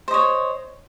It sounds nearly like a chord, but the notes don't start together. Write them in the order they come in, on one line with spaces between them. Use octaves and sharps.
C5 D#5 C#5